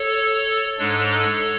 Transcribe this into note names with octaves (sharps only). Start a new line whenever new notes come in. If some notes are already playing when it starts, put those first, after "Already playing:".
Already playing: A4 C#5
G#2 G#3 D4 A4 C#5